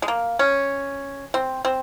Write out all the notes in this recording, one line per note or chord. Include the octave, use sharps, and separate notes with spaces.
G#3
A#3
C#4
C4
C4